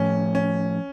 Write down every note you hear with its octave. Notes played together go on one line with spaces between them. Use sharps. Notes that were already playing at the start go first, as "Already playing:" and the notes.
Already playing: A2 F3 A3 C#4
C#4